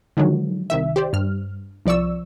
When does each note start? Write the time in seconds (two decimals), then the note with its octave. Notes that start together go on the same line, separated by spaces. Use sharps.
0.17 D3 D#3 F3 F#3 G#3
0.70 C2 D#3 E5
0.96 G4 C5 D5
1.13 G2 F6
1.86 C2 F3 D5 C#6 E6